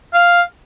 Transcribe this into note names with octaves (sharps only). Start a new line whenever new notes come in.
F5